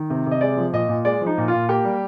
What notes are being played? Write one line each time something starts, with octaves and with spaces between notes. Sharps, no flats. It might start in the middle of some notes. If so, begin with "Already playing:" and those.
Already playing: D#3
C3
C3
D#5
G#3 D5
F3
A#2 D#5
A#2
G#3 D5
F3
D#4
A#2
F4
A#2
A#3 G4
G3